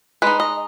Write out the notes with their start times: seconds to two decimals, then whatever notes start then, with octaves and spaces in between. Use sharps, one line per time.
0.22 G#3 D#4 B4
0.40 D#5